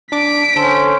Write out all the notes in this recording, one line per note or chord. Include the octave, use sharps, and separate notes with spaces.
D4 D6 B6 D7
D3 C#4 A4 C5